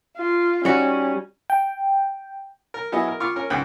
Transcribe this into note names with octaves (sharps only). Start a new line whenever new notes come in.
F4
G3 C#4 D#4 F#4
G5
A#4
F#3 B3 E4 G#4 D#5
A#4
F4 C#6 D6 F6
C#4 A#4
C#2 G#2 F#5 G5 D#6